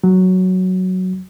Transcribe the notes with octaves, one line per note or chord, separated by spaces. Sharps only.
F#3